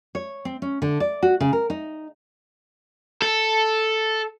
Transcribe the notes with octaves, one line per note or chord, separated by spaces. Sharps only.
C#5
C4
C#4
D3
D5
F#4
C#3
A#4
D#4
A4